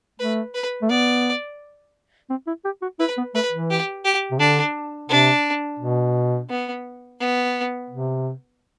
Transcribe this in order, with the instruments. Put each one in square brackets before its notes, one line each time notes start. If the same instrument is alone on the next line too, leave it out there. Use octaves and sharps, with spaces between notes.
[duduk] A3 [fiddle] B4
[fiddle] B4
[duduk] A3
[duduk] B3 [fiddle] D5
[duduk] C4
E4
G4
F#4
[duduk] E4 [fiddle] B4
[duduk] B3
[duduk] A3 [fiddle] B4
[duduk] E3
[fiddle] G4
G4
[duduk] C3
[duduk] D3 [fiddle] D4
[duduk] C3 [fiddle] D4
[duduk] B2
[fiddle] B3
B3
[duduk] C3